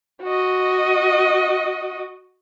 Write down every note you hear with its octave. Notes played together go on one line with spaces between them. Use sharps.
F#4 D#5